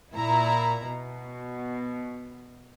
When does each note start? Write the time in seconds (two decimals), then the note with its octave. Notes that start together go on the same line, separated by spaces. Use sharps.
0.14 A#2 E4 A#5
0.88 B2